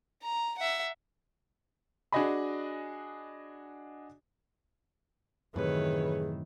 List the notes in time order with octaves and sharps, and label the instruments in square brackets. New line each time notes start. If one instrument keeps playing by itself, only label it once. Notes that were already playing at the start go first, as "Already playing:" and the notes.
[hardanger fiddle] A#5
E5 F#5
[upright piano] D4 F#4 G#4 D#5 G#5 B5
[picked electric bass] F#2 A2 C3 [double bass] D#3 E3 [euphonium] G#4 [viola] B4 C#5